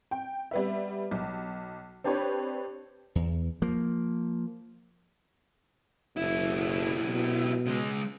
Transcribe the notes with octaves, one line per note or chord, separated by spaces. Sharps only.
G5
G3 B3 E5
B1
C4 D4 G4 B4 C#5
E2
F3 A#3
F#1 B1 E4
B2
C#3 G#3